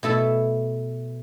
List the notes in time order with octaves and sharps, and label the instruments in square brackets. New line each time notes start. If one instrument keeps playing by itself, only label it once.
[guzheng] B2 A3 E4 A4 E5